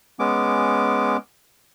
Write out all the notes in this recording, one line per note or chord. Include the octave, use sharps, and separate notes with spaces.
G#3 B3 C#4 D6